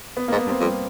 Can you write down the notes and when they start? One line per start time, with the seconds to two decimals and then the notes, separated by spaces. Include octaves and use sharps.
0.17 B3
0.28 A#3
0.32 G#2
0.38 B3
0.46 G2
0.49 C4
0.61 F2 G3